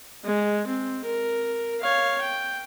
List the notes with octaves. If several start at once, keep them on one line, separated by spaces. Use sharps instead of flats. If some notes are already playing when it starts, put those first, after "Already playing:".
G#3
C4
A#4
C#5 F5
G5